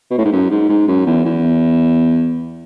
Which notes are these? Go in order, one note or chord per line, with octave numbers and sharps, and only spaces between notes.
B2
A2
G#2
F#2
G#2
G#2
F#2
E2
E2